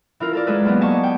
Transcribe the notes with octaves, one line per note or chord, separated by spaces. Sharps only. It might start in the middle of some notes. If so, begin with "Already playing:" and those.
E3 F4 A#4
A4 A#4 D5
G#3 G#4 A4 B4
F#3 A#3 B3
D5 D#5 G#5 A5 C#6
G5